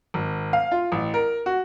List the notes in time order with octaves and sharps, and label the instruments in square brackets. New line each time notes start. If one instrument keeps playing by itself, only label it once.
[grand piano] G#1
F5
F4
A1
A#4
F#4